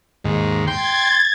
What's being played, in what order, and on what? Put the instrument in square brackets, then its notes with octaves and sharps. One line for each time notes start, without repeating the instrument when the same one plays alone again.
[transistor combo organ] D#2 G#2
[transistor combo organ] G5 C6 [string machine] G#6 A6